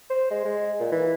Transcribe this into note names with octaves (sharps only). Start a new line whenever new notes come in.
C5
G#3
G#3
A#2
E3